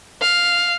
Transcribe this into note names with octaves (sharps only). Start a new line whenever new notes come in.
F5